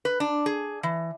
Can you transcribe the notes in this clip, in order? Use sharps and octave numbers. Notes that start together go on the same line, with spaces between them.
B4
D4
G#4
E3